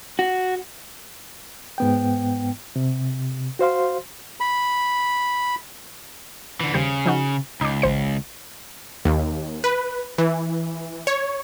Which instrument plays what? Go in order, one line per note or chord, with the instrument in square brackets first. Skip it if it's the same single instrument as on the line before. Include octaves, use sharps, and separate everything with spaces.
[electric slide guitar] F#4
[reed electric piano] G#2 B3 G5
C3
F#4 C5 F5 C6
[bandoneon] B5
[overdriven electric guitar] D3 E3
[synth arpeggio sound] D#2 G3 C5 [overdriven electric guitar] C#3
[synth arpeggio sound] F3 D#4 F#4
[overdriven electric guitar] C#2 [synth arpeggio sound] D#4 D6
[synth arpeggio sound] A1 C5 C#7
[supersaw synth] D#2
B4
E3
C#5